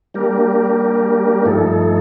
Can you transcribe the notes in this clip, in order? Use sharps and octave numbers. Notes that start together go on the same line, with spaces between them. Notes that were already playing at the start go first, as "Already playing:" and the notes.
G3 A#3 D4 G4 A#4
G2 F3 A3 D#4 A4